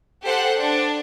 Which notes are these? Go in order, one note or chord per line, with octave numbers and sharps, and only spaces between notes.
G4 A4 C5 F#5
D4